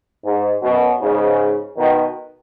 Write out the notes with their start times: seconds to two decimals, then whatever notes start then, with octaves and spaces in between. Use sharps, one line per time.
0.24 G#2
0.63 F#2 B2
1.01 G#2 C#3
1.78 B2 D#3